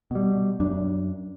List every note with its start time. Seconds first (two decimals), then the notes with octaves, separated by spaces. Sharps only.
0.11 B2 G3
0.60 F#2 D4